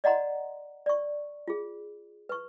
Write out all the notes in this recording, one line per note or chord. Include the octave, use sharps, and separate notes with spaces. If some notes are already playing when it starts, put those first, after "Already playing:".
D5 D#5 F#5 A#5 C6
D5 C#6
F4 G#4
B4 C#6